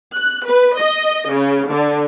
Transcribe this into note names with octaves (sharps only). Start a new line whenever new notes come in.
F#6
B4
D#5
C#3
D3